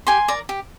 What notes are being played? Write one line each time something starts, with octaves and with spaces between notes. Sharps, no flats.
G4 G#5 C6
A#4 D5
G4